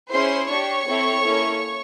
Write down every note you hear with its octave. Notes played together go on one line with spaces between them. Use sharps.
C#4 E4 G#4 C5 C6
D4 G4 C#5 C#6
C4 E4 A4
A#3 C#4 E4 A4